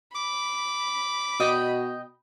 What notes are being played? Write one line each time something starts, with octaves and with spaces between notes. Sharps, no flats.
B5 D6
B2 D#5 G5